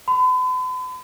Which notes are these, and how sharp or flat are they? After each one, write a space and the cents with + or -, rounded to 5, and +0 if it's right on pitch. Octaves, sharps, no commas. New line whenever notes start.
B5 +45